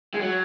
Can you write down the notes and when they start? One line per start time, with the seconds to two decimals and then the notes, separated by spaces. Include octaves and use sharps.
0.14 G#3
0.20 F#3